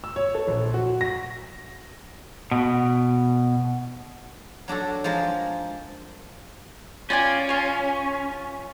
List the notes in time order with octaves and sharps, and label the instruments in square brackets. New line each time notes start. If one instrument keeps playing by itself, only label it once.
[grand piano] E6
C#5
A4
A#1
F#4
A#6
[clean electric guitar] B2
[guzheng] F#3 D4 F#4 A4
F3 G#3 A#4
[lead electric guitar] C#4 [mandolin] F4 D5 G#5
[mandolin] F4 C#5